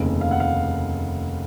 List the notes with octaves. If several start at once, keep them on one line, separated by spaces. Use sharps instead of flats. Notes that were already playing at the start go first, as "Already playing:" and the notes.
Already playing: F1 D#2 C#3
F5
F#5
F5